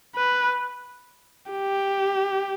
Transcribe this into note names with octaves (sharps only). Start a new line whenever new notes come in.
B4
G4